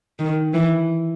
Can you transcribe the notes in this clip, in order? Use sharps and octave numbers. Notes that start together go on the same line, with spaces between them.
D#3
E3